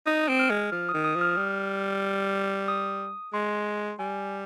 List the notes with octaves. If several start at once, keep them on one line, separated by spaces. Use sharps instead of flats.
D#4 D#6
C4
F6
G#3
F3 F6
D#6
D#3
D#6
F3
F6
G3
D#6
G#3 C6
G3 G#5